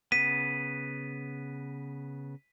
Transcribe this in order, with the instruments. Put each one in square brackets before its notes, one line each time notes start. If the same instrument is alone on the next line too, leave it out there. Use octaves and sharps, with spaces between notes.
[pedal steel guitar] C#3 B3 [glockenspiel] B6 D#7